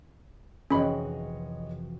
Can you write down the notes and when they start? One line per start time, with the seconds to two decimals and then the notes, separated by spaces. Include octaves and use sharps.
0.70 F1 E3 C#4 F#4 G#4 C#5 D#5 B5